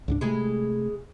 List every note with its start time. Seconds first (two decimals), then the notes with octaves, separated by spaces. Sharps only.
0.08 C#2 G#2 D4
0.21 C3 G#3 A3 E4 G#4